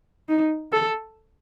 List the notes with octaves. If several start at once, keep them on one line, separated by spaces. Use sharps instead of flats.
D#4
A4